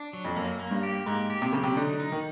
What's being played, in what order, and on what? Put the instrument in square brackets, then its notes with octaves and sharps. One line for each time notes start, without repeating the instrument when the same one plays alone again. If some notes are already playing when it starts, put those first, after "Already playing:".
Already playing: [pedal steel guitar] D4
F#3
[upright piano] F2
[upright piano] F#2 [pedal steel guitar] A#3
[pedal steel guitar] A#3
[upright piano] G2
[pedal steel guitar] G4
[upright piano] G#2 [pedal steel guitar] A#3
[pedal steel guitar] G4
[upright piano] C3
[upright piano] C#3 [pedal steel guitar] F#3
[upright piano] C3
[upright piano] D3 [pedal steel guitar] D#4
[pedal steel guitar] D#4
[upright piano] D#3